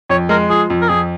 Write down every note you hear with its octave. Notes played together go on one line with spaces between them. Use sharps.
F2 C#5
G#3 A#4
F3 G#4
F2
A#4
F2 G#4